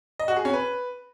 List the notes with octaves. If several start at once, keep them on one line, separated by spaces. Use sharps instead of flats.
D#5
F#4
G#4
C#4
B4